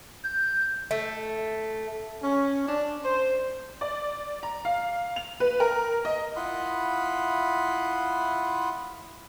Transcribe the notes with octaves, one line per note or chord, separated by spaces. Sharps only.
G6
A3
C#4
D4
C5
D5
A#5
F5
F7
B4
A#4
D#5
E4 F4 F#5 B5 C6 D#6